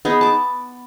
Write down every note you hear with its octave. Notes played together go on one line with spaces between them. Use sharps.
B3 D#4 G#4
A5 D6